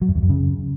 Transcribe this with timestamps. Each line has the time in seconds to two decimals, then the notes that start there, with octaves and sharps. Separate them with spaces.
0.02 F#3
0.09 F#2
0.16 E2
0.23 F#2
0.29 C#3